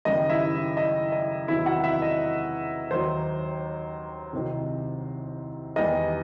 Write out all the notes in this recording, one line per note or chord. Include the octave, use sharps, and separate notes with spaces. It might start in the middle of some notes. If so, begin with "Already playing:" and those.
F#1 F#2 D#3 G3 D#5
E4 E5
D#5
D#5
E2 C3 D#3 F#3 E4 E5
F#4 F#5
E4 E5
D#5
D#2 D#3 F#3 C5
C2 C3 D#3 F#3
E2 D#3 G3 D#5